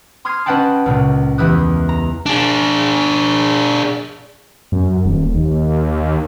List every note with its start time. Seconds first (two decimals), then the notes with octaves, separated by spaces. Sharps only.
0.25 C6 D#6 F6 G#6 C7
0.46 C#4 B4 D#5 F#5 G5 A5
0.86 C#2 A#2 C#3
1.38 E2 E3 G4 E5 D#6 F#6
1.89 A#5
2.26 D4 G#4
4.72 F#2
5.05 D#1
5.35 D#2